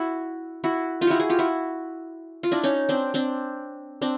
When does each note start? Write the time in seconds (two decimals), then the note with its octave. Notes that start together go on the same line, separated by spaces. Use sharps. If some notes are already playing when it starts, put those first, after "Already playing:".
Already playing: E4 F#4
0.64 E4 F#4
1.01 D#4 F4
1.07 E4 F#4 G4
1.20 F#4 G#4
1.29 F4 G4
1.39 E4 F#4
2.43 F4
2.51 D4 E4
2.63 C#4 D#4
2.89 C4 D4
3.14 C4 D4
4.02 C4 D4